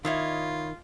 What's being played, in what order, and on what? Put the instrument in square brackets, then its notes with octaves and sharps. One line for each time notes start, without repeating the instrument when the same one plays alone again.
[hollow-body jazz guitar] D#3 [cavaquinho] E4 C#5 D#5 [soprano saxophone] F4